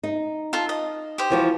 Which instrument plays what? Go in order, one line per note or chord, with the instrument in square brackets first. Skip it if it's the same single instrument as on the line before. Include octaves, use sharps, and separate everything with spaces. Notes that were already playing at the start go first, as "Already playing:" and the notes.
[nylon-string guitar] D#4
[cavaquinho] F4 A4
D#5
G4 C5
[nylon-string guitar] E3 F3 F#4